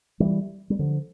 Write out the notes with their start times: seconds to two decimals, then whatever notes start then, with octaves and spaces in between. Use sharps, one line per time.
0.20 E3 G3
0.70 G3
0.79 D3 F3